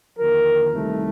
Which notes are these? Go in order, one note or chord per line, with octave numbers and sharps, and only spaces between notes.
D#2 D3 F3 A#4
C2 C3 D#3 A3